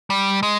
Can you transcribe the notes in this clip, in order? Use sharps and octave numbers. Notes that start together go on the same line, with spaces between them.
G3
G#3